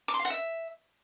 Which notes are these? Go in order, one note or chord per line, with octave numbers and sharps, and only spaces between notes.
D6
C6
F5
F#5
E5